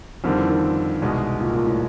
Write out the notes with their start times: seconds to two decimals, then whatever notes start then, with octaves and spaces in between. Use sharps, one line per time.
0.24 F2 D3 D#3 G3 C4
0.37 E3
0.49 D#3
1.02 C2 B2 G#3
1.41 A#2
1.53 A#2
1.67 A2